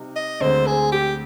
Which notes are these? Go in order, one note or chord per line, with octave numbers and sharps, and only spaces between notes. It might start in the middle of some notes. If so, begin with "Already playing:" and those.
Already playing: C3 G3 D#4
D#5
D2 D3 G#3 C4 C5
G#4
G4